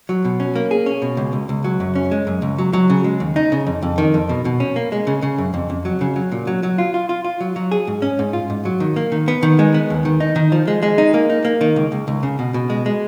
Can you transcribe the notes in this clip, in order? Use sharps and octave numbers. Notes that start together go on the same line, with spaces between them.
F#3
B2
C#4
A#3
G#4
C#4
B2
C#2
C#2
C#2
F#3
F#2
C#4
G#3
F#2
C#2
F#3
F#3
C#3
G#3
D#2
D#4
C#3
F2
F2
D#3
F2
B2
B2
C#4
A#3
G#3
C#3
C#3
F#2
F2
F2
F#3
C#3
F#3
A#2
F#3
F#3
F4
F4
F4
F4
F#3
F#3
G#4
G#2
C#4
G#2
F4
G#2
F#3
D#3
A#3
D#3
B3
D#3
G#3
B3
D#2
D#3
D#4
D#3
F3
G#3
G#3
D#4
A#3
D#4
A#3
D#3
C#2
C#2
C#2
C#3
B2
B2
G#3
G#3